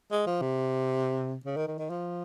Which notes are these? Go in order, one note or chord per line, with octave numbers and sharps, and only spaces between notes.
G#3
F3
C3
C#3
D#3
D#3
D#3
F3